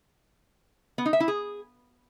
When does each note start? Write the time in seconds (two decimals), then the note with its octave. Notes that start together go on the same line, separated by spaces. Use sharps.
0.98 B3
1.06 D#4
1.13 E5
1.20 E4
1.28 G#4